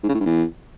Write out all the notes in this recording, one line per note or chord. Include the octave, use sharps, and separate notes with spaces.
G#2
C#3
A2
G2
E2